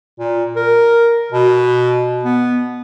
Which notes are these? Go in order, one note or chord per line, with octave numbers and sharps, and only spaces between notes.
A#2
A#4
B2
B3